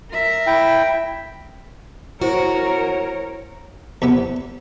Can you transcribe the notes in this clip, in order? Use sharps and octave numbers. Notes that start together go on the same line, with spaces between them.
A#4 E5
E4 G5
E4 F#4 A#4 C5 C#5
E2 C3 B3